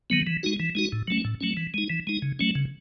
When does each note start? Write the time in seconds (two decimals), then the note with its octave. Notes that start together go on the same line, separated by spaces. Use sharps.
0.10 D#3 F#3 B3
0.27 E3
0.43 G#3 D#4 F#4
0.60 E3
0.75 G#3 D#4 F#4
0.92 A2
1.08 F#3 A3 C#4
1.25 A2
1.41 F#3 A3 C#4
1.57 E3
1.74 G#3 D#4
1.90 E3
2.07 G#3 D#4
2.22 C#3
2.39 F#3 A3 C#4
2.55 C#3